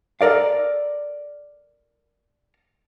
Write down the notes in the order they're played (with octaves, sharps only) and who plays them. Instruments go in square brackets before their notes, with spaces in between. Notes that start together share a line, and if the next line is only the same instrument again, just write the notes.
[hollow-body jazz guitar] A4 A#4 D5 F5